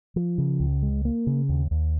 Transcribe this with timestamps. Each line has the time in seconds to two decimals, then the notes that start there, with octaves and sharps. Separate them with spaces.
0.16 F3
0.38 C#3
0.60 C#2
0.82 G#3
1.05 A#3
1.27 C#3
1.49 D#2
1.71 D#2